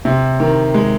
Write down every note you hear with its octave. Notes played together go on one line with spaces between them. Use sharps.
C3
D#3
G#3